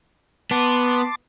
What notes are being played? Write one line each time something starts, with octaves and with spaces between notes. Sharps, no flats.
B3 A5 C6 D6